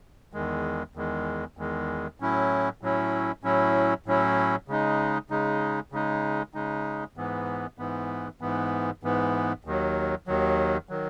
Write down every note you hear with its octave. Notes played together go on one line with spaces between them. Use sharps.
E2 D#3 G#3
E2 D#3 G#3
E2 D#3 G#3
A2 F#3 C#4 E4
A2 F#3 C#4 E4
A2 F#3 C#4 E4
A2 F#3 C#4 E4
C#3 G#3 D#4
C#3 G#3 D#4
C#3 G#3 D#4
C#3 G#3 D#4
G#2 E3 B3
G#2 E3 B3
G#2 E3 B3
G#2 E3 B3
D#2 D#3 F#3
D#2 D#3 F#3
D#3 F#3